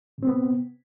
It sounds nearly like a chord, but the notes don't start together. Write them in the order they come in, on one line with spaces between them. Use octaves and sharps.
C3 C4 B3